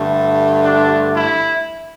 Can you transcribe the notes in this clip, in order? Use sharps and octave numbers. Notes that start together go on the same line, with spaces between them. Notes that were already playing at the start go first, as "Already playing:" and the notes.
Already playing: G2 D3 A3
D4
E4